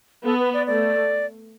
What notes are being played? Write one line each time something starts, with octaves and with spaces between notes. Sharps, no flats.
B3 A4
B4
D5
A3 D5